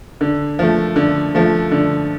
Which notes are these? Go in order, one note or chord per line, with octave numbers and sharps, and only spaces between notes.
D3
F3 A3
D3
F3 A3
D3